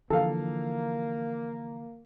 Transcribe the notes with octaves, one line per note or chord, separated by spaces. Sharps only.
D3 E3 F3 A#3 A4 F5